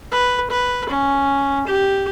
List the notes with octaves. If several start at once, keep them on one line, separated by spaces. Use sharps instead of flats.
B4
B4
C#4
G4